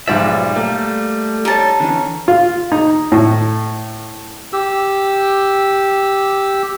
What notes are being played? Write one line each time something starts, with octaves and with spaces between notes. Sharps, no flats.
B1 G#2 F3 G3 D5 E5
A3 A#3
D#4 G4 C#5 A5
D3 E3 C#4
F4
D#4
A2
G4 E6